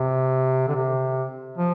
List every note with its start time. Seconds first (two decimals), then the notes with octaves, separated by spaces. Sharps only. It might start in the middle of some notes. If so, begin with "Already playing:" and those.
Already playing: C3
0.68 D3
0.76 C3
1.58 F3